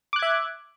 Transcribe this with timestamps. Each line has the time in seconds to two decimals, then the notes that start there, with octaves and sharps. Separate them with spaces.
0.13 D6
0.16 F#6
0.19 G#6
0.22 E5